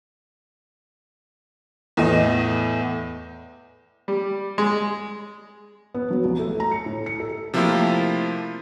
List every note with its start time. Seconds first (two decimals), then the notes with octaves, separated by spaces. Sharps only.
1.97 E2 A2 D#5
4.08 G3
4.58 G#3
5.95 B3
6.11 F#3
6.25 C2
6.40 A3
6.60 A#5
6.71 C#7
6.86 A2
7.06 C#7
7.20 A4
7.54 C3 F3 A3 A#3 E4 F4